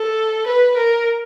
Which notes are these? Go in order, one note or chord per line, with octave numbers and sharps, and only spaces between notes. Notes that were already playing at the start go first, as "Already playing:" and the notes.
Already playing: A4
B4
A#4